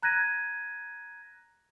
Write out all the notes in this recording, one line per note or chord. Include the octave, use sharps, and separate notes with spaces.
A#5 F#6 G#6 A#6 D#7